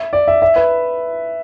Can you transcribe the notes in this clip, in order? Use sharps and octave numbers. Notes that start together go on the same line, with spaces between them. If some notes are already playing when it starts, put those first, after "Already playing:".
Already playing: E5
D5
E5
E5
B4